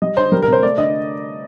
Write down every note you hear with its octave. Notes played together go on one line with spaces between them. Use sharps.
G3 D#5
D3 C5
G3 A#4
A#4
C3 C5
A3 D5
D3 D#5